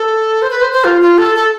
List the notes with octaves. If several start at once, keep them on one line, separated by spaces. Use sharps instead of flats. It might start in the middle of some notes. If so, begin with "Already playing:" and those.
Already playing: A4
C5
B4
C5
C5
F4
F4
A4
A4